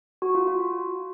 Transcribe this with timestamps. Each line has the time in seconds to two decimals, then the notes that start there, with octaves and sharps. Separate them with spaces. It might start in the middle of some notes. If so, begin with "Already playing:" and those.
0.22 F#4
0.35 F4
0.47 F4
0.60 F#4